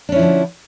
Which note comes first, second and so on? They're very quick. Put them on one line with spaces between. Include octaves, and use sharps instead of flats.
D4 C#4 E4 F3 D3